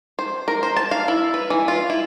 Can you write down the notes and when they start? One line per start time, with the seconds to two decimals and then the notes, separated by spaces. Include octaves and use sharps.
0.19 C5
0.48 A#4
0.63 C5
0.77 A5
0.91 F5
1.08 E4
1.34 B4
1.50 E3
1.68 F4
1.90 E4